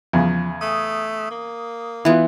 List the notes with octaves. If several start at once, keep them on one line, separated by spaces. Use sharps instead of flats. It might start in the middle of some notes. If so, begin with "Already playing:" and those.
E2 C#3 F3
A3 D#6
A#3
E3 B3 E4 F4